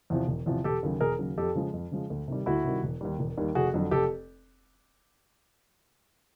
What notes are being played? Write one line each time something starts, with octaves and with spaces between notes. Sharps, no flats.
E2 C3 F3
E1
E2 C3 F3
E1 G4 A4
D#2 C#3 F#3
E1 G#4 A#4
D#2 C#3 F#3
F2 G4 A4
C#3 F3 G#3
F2
C#3 F3 G#3
D2
C3 D#3 G3
D2 E4 F#4
C3 D#3 G3
E1
D#2 D#3 G3
E1
D#2 D#3 G3
F1 F#4 G#4
F2 D3 F#3
F1 G4 A4